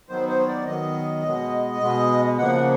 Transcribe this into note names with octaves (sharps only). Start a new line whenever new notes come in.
D#3 F#3 B3 C5
C5
C#5
D5
D#3 F#3 B3 D#5
B2 G#3 B3
B2 G#3 B3
C#3 F3 A#3 F#5